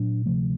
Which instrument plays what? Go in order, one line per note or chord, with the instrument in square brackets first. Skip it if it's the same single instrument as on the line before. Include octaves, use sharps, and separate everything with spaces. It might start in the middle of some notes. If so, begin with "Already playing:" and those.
Already playing: [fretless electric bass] A#2 F#3 D4
D2 C3 F3 A3